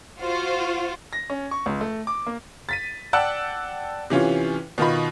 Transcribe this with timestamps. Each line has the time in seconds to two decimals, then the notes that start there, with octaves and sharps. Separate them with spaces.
0.19 F4 F#4 C5
1.13 A#6
1.30 C#4
1.51 C#6
1.66 C#2
1.81 A3
2.07 D6
2.27 A#3
2.69 A6 B6 D#7
3.13 D5 F#5 G5 A5 E6 F#6
4.10 C3 E3 C#4 F4
4.78 B2 D#3 F4 B5